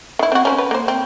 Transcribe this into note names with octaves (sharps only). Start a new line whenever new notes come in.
D#3 E4
C4 F#4
C#4 A#4 C5
B4
A#3 C5
C4